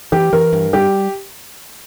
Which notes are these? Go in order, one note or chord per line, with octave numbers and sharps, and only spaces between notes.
E3 G4
E3 A#4
G2
G3 G4